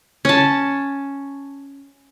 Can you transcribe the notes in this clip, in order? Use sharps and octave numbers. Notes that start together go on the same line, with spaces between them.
C#4 A5